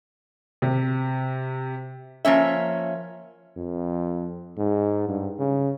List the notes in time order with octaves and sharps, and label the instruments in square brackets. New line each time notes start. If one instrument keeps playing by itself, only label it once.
[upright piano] C3
[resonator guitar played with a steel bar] F3 A#3 C#4 E5
[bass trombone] F2
G#2
G2
C#3